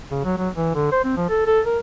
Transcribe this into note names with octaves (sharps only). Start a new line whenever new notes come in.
C#3
F#3
F#3
E3
D3
C5
C4
F3
A4
A4
A#4